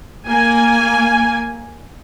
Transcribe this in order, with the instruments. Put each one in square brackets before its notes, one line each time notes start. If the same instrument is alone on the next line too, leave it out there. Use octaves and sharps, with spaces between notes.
[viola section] A#3 G#5